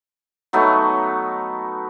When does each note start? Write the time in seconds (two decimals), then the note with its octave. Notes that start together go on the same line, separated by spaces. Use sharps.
0.53 F#3 A3 B3 D#4